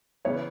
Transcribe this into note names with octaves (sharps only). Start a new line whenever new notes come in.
C#3 E3 B3 C#5